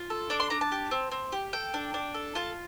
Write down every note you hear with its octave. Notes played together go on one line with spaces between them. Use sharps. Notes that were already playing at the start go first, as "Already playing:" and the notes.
Already playing: F4
A4
D4 D6
C6
D4 A#5
A5
G4
C4
C4
G4
A4 G5
D4
D4
A4
F4 A5